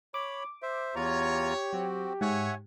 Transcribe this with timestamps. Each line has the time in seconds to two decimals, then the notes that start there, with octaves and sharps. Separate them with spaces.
0.14 C#5 B5 D6
0.62 C5 E5
0.95 E2 F4 G4 C#5 A#5
1.73 F#3 C4 F#4
2.21 G#2 C#5 E5 F#5 G#5